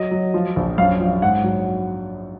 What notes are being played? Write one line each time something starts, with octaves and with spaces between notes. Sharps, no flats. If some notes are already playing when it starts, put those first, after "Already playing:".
Already playing: F#3 D#5
F#3
F3
A#1
F#2 F5
F3
G#2 F#5
F#3